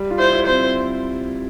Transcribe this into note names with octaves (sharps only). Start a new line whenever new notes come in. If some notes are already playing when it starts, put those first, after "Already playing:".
Already playing: G3
F4
E4 C5
E4
C4 C5